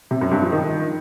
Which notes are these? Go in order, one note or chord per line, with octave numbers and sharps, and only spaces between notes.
C3
F#2
G2
F3
D#3